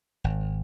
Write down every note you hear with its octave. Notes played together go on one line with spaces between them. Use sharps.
G#1